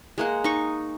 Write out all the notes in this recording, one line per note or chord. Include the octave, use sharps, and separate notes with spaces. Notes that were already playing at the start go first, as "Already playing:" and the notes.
G#3 A#3 F#5
D#4 C#6